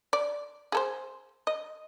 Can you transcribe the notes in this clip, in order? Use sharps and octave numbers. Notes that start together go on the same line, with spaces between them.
D5
G#4 A4 C5
D#5